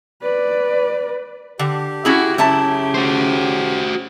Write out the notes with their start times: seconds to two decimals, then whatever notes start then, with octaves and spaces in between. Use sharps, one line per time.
0.22 B4 D5
1.59 D3 G4
2.05 C#4 E4 F#4 G#4
2.38 F#2 C#3 E4 A5
2.94 F#4 C5